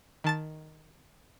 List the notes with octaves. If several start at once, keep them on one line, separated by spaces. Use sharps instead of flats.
D#3 A5 A6